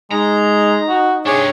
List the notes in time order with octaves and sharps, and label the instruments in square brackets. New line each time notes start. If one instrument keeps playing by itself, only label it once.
[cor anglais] G#3 [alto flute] D#4 [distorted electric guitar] A#5
[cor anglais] F#4
[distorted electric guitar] C3 D4 [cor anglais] G#4 [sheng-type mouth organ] C#5